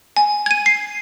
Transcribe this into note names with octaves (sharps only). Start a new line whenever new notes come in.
G#5
G#6 D#7
C7